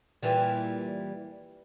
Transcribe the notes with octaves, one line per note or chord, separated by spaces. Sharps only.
A#2 E3 G3